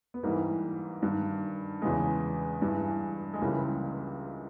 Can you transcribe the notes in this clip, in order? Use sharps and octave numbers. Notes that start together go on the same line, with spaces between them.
B3
G#2 E3 G3 A#3
G2 D#3
E2 C#3 E3 G#3 B3
G2 E3
G#3
C#2 C#3 E3 G3 A#3